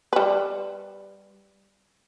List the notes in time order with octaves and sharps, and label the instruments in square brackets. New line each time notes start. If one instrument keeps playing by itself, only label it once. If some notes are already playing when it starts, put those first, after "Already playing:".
[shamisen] G3 B4